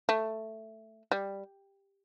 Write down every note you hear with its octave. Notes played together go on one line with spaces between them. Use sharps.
A3
G3